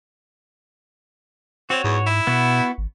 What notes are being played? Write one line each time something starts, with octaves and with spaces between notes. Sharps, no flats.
C4 F#4 C#5
E2 G#2
E4
B2 B3 F#4
G#1